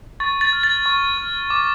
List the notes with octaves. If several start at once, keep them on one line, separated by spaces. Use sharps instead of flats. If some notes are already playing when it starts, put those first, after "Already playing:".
C#6 A6
A6
F6
A6
C#6
F6
D6